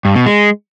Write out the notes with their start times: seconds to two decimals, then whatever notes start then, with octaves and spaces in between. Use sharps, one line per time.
0.05 G2
0.15 B2
0.26 G#3